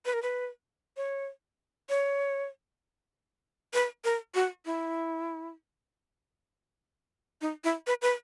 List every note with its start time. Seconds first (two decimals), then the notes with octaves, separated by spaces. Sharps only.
0.05 B4
0.14 A#4
0.23 B4
0.97 C#5
1.89 C#5
3.74 B4
4.04 A#4
4.35 F#4
4.66 E4
7.41 D#4
7.64 E4
7.87 B4
8.02 B4